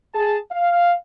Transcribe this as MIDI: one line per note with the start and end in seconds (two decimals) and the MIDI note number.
0.14 0.37 68
0.14 0.37 81
0.51 0.94 77